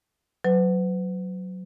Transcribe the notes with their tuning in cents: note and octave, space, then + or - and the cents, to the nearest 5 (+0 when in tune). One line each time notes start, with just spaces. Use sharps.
F#3 +0 B4 +40